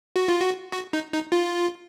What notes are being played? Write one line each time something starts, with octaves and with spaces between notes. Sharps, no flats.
F#4
F4
F#4
F#4
D#4
D#4
F4